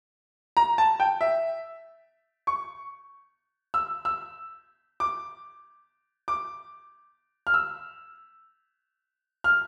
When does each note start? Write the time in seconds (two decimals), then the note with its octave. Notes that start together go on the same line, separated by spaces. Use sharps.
0.57 A#5
0.78 A5
1.00 G5
1.21 E5
2.47 C#6
3.74 E6
4.05 E6
5.00 D6
6.28 D6
7.47 F6
7.54 E6
9.44 F6